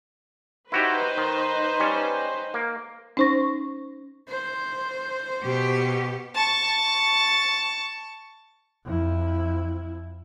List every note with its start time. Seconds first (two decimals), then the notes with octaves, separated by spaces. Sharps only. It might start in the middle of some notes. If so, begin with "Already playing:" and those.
0.72 D#4 E4 F#4 G4 B4 C5
1.17 D#3
1.80 G3 C#4
2.54 A#3
3.17 C#4 D#4 C5 C#6 A#6
4.29 C5
5.43 B2 G4
6.34 A5 C#6
8.85 F2 E4